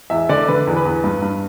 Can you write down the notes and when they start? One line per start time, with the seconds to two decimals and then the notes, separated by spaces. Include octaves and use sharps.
0.10 E2 E5
0.29 D3 D5
0.48 D3 B4
0.67 E2
0.76 B4
0.85 E2
1.04 G2
1.22 G2